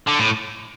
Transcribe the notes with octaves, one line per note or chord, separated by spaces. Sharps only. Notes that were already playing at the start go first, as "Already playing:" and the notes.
D3
A2